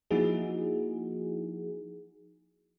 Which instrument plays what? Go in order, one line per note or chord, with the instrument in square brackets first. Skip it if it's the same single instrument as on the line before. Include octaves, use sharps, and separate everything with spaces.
[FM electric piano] F3 A#3 D#4 E4 F#4 G#4